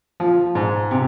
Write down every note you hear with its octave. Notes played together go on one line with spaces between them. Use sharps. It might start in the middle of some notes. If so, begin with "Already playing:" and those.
F3
G#2
C3